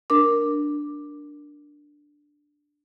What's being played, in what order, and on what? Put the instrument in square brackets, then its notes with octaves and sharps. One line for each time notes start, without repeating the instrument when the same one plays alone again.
[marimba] D4 A#4 D6